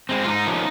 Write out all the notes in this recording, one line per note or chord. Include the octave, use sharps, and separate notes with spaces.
G#3 C4
F4
G#2 D#4
F3 A#3 C#4